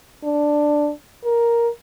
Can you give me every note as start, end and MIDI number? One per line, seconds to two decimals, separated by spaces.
0.24 0.91 62
1.24 1.69 70